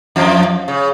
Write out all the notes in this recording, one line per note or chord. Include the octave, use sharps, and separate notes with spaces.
F2 F3
C#3